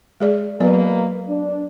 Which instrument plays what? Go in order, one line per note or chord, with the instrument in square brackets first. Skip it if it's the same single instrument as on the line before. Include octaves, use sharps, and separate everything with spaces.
[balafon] G#3 G#4 D5
[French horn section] B2 A#3 B4 [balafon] F#3 B3 D5
[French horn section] D4